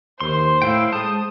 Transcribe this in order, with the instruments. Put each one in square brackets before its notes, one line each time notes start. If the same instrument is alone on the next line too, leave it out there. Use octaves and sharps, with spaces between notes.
[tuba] D#2 [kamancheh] C5 [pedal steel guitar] C6
[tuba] A2 [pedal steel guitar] E4 F5 G5
[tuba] G#3 [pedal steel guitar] C5 A5 [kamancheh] D#6